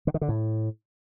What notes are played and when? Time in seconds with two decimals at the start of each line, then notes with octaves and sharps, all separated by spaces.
0.07 D3
0.14 D#3
0.21 D3
0.29 A2